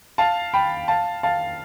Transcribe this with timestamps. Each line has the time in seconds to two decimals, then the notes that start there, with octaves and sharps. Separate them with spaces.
0.18 F5 A5
0.53 G5 B5
0.88 F5 A5
1.23 F5 A5